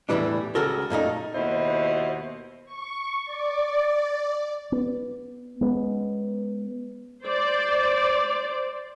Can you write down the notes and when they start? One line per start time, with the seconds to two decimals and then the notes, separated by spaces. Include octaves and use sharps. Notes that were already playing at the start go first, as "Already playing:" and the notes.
0.09 E2 A2 C3 E3 G3 D4
0.55 C#2 C#3 F#4 A4 A#4
0.90 F#2 A#2 A3 D#4
1.34 D#2 B2 E4 C5 D#5
2.66 C#6
3.25 D5
4.72 B3
5.61 G#3 B3 C#4
7.24 C5 D5